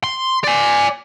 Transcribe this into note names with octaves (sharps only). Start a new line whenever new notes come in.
C6
D5 G#5